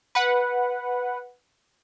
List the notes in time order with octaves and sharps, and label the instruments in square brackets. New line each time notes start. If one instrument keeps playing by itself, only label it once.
[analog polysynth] B4 F#5